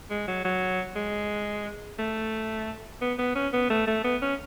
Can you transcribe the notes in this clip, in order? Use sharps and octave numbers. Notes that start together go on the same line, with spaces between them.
G#3
F#3
F#3
G#3
A3
B3
B3
C#4
B3
A3
A3
B3
C#4